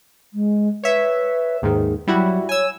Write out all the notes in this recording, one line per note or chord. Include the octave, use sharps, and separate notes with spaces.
G#3
B4 C#5 E5
D#2 G#2 D#3 G#4
F#3 G3 E4 F#4
C#5 G#5 E6